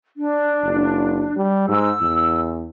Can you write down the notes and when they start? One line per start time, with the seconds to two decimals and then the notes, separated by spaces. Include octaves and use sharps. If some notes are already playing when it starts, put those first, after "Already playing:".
0.16 D4
0.63 F#1
1.36 G3
1.68 G#2 E6
2.01 E2